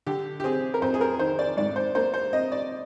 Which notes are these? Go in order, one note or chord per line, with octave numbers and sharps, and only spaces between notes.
D3 G4
G4
C4 G#4
A#4
F2 C5
G#4
A#4
D#3 C5
D5
G#2 D5
C5
A#3 C5
C5
C4 D#5
D5